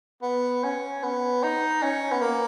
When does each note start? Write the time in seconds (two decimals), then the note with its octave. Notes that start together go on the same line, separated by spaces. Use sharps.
0.22 B3
0.63 C#4
1.03 B3
1.43 D#4
1.83 C#4
2.12 B3
2.22 A#3